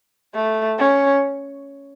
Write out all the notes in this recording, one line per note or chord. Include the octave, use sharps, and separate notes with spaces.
A3
C#4